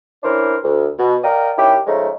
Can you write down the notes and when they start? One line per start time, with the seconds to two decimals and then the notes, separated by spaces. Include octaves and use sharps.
0.23 E3 C#4 D4 A#4 C5
0.63 D2
0.98 B2
1.23 A#4 D5 D#5 F5 G5
1.57 D#3 C#4 E4 G4
1.86 C#3 F3 G#3 A3 D#4